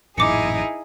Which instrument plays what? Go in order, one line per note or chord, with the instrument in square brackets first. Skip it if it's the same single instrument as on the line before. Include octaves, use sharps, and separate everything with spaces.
[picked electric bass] A1 F#2 A#2 [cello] D#4 [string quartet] E4 G#4 [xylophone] D6 C#7